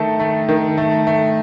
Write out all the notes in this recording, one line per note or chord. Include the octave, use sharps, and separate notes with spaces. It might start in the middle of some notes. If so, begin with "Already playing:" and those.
Already playing: D#3 A3 A4
A3
D#3
A3
A3